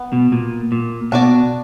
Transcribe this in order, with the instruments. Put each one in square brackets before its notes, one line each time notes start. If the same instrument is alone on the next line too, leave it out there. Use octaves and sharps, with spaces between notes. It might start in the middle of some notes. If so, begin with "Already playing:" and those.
Already playing: [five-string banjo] B3
[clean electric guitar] B2
A#2
A#2
[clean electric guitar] B2 [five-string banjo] D4 F#4 D5